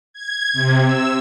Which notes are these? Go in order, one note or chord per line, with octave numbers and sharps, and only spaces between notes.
G#6
C3
E6